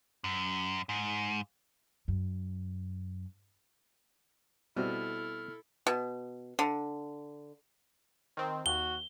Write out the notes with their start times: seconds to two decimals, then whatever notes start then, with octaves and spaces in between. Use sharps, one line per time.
0.24 F#2
0.89 G#2
2.08 F#2
4.76 B2 G3 C4 E4 A4 E5 F6
5.87 B2
6.59 D3
8.37 D#3 C4
8.66 D#2 F#4 G7